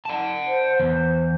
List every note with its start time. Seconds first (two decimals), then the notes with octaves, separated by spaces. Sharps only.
0.06 F#5 A5
0.46 C5
0.80 E2